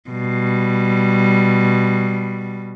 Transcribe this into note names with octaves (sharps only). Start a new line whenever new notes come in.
B2 G3